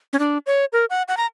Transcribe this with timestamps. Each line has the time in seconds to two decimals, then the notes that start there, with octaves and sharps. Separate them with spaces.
0.13 C#4
0.19 D4
0.46 C#5
0.73 A#4
0.90 F#5
1.08 F#5
1.17 A#5